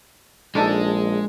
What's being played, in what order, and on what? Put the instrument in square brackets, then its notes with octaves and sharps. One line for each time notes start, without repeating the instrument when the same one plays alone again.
[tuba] A#1 [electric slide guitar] G#3 [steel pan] D4 D#4 A4